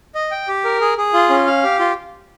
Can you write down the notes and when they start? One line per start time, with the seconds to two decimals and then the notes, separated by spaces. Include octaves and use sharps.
0.15 D#5
0.31 G5
0.48 G4
0.65 A#4
0.81 G#4
0.98 G#4
1.14 F4
1.30 C#4
1.47 F5
1.63 G4
1.79 F4